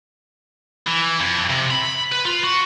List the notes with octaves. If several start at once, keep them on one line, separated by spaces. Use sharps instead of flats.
E3
F2
C3
B5
B4
F4
F#4